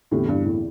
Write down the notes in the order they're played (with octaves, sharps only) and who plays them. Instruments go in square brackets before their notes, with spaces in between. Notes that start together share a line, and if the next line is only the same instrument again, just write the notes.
[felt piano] E2 D3 C4 E4 G4 [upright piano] A2
[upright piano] G2
A2